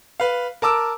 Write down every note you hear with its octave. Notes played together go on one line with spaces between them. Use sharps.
B4 F5
A#4 A5 D6 E6